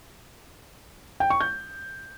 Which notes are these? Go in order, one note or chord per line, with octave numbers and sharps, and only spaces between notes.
G5
C#6
G6